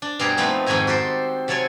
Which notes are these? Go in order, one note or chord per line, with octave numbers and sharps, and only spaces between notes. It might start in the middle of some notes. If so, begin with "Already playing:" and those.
D4
G2 B2 G3 G#4 A#5 C6
F3 A3 B3 C4 D#4
F2 G#2 D#3 D#4 G#5 A#5
F#4 G4 A4 C5
C3 F#3 C4 A4 C#5 G#5